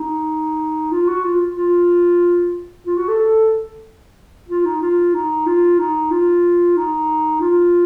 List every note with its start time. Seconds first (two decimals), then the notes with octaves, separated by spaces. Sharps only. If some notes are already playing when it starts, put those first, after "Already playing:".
Already playing: D#4
0.92 F4
1.08 F#4
1.24 F4
1.57 F4
2.86 F4
2.97 F#4
3.08 A4
3.19 A4
4.49 F4
4.65 D#4
4.81 F4
5.14 D#4
5.46 F4
5.79 D#4
6.11 F4
6.77 D#4
7.41 F4